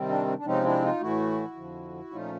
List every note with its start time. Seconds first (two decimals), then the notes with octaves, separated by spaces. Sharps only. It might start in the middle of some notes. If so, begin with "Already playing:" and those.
Already playing: C3 D#3 G3 C4
0.09 D4
0.27 D4
0.38 D4
0.45 C3 F3 G#3 C4 C#4 D#4
0.64 D4 E4
0.82 D#4 F4
1.00 A2 E3 A3 E4 F#4
1.56 F2 D3 F3
2.11 A#2 F3 A3 C#4 D#4 F4